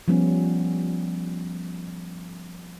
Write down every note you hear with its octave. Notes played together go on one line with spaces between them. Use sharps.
F3 G3 B3 C#4